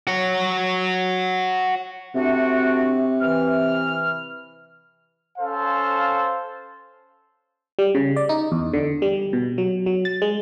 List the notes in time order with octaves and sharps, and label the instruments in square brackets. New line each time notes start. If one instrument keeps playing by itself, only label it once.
[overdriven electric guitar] F#4 C#5
[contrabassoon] C3 [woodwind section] A3 D4 F#4
[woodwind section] E3 F6
[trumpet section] C#4 A4 C5 F5
[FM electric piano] G3
C#3
D5
D#4
E2
D3
G3
B2
F#3
F#3
A6
G#3